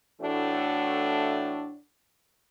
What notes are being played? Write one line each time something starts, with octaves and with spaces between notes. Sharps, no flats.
A2 E3 A3 D4 F#4